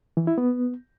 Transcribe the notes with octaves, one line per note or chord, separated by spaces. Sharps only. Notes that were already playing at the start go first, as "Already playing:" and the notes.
E3
E4
B3